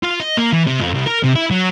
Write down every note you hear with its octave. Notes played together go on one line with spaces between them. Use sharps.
F4
D#5
A#3
E3
C3
F2
C2
A#4
C3
E4
F#3